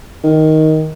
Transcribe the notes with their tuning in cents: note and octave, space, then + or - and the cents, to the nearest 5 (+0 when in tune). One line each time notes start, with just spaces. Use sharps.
D#3 +10